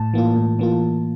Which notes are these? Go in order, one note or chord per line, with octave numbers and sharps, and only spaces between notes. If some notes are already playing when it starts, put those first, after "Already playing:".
Already playing: A2 A5
E3 A#3 F4
A2
E3 A#3 F4